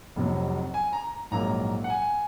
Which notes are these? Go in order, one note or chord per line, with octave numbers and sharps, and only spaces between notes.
F1 F2 C3 F#3
G#5
A#5
A#1 G#2 F#3 A#3 A#5
F#5
G#5